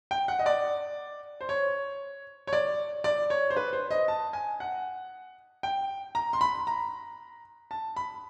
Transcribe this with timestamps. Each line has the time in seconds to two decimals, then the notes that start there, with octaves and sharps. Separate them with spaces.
0.11 G5
0.28 F#5
0.39 D#5
0.46 D5
1.41 C5
1.49 C#5
2.47 C#5
2.53 D5
3.04 D5
3.30 C#5
3.50 C5
3.57 B4
3.73 C5
3.91 D#5
4.08 A5
4.33 G#5
4.60 F#5
5.63 G5
6.15 A#5
6.33 C6
6.41 B5
6.67 A#5
7.71 A5
7.96 B5